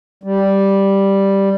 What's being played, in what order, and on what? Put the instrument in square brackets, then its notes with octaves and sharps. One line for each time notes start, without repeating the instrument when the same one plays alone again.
[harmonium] G3